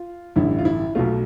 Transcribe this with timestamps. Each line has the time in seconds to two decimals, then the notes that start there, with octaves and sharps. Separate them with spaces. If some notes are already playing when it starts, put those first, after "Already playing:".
Already playing: F4
0.36 A1 G2 D3 E4
0.59 F4
0.65 E4
0.95 B1 B2 A3 F4